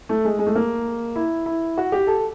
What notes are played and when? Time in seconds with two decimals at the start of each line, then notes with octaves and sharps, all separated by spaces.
0.09 A3
0.25 G#3
0.39 G#3
0.47 A3
0.55 A#3
1.16 E4
1.46 E4
1.78 F#4
1.92 G4
2.07 A4